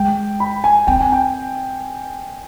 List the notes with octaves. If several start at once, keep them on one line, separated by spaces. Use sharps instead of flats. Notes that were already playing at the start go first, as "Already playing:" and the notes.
Already playing: G#3 G5
B5
G#5
C4 G5
G#5
G5